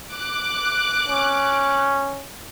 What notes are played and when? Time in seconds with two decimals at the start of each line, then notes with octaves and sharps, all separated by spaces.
0.13 D6 F#6
1.09 C#4